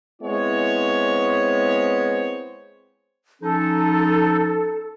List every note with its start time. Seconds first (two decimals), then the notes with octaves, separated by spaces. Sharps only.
0.23 G#3 B3 C4 E4 C5 C#5
3.42 F3 C#4 D#4 A4